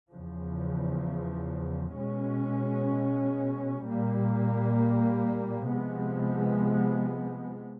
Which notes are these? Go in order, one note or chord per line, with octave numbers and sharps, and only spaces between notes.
E2 C#3 F3
B2 G#3 C#4
A#2 G3 A#3
C3 F3 G#3 B3